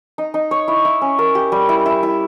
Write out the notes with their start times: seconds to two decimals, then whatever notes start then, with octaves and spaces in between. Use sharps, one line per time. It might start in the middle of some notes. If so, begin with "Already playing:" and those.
0.18 D#4
0.34 D#4
0.51 C#5
0.68 E4
0.85 E4
1.01 C#4
1.19 A#4
1.35 G4
1.52 G3
1.69 E4
1.86 E4
2.03 E4